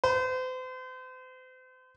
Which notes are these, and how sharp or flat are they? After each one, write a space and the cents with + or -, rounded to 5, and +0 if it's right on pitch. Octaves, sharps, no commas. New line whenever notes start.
C5 -40